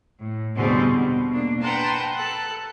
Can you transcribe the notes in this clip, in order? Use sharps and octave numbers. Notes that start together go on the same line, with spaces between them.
A2
E2 B2 D3 G3 G#3 C4
B2
A#3 D4
B4 F#5 G5 A5 A#5 C6
A4 A5 F#6